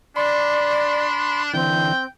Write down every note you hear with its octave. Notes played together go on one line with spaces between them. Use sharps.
D4 D5 B5 C6
D3 E3 C4 G5